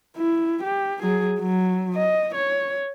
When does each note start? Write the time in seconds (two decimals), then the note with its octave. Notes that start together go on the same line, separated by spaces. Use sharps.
0.17 E4
0.63 G4
1.02 F#3 G#4
1.39 F#3
1.94 D#5
2.35 C#5